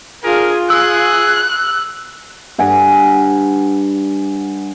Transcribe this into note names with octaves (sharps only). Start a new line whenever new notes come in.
D4 F4 G#4 A#4
G#4 E6 F#6
G2 F#5 G#5